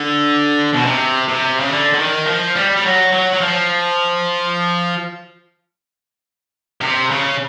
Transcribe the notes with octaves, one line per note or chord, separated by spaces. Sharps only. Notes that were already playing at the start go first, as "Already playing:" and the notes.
Already playing: D3
B2
C3
C3
C#3
D3
D3
D#3
F3
G3
G3
F#3
F#3
F#3
F3
C3
C#3